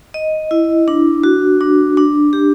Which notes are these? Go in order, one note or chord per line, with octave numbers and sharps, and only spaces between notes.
D#5
E4
D4
F#4
D4
D4
G4